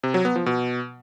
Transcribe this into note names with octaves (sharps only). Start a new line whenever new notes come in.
C3
F#3
B3
F3
B2